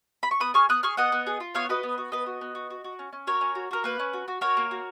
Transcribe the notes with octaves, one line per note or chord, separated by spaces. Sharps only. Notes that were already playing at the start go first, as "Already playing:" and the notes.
B5
C#6
B3 B5 D#6
G#4 C#6 F6
B3 D#6 F#6
G#4 C#6 F6
B3 D#5 F#5
B3
G#4
F4
B3 C#5 F5
F#4 B4 D#5
B3
F#4
B3 B4 D#5
F#4
B3
F#4
F#4
F#4
C#4
C#4
F#4 A#4 C#5
C#4
F#4
F#4 A#4
A#3 B4
C#4
F#4
F#4
F#4 A#4 C#5
A#3
F#4